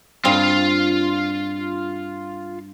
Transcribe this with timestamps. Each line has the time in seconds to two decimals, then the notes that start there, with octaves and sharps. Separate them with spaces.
0.25 G2 C4 F4 F5